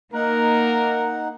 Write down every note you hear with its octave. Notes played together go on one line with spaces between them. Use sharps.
A#3 D#4 A#4 F#5